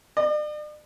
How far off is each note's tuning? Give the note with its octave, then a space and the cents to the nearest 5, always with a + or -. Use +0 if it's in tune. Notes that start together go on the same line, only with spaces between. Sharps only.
D5 +40